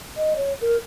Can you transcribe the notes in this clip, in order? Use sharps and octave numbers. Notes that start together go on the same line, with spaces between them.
D#5
C#5
A#4